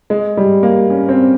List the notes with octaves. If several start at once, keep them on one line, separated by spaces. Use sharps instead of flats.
G#3
G3
A#3
C#4
C4